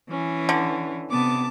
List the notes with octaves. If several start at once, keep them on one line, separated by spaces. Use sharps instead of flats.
E3 C#4
D3
C3 B3 A5 D6